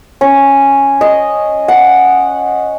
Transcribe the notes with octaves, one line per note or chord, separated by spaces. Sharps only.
C#4
D#5
F#5